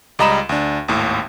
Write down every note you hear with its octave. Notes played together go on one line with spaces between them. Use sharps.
C#2 G3 D#5 A#5 B5 E7
D2 D4
G#1 D#2 A2